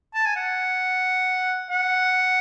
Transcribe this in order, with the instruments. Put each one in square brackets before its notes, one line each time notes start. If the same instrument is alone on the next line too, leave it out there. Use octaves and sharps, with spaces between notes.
[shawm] A5
G#5
F#5
F#5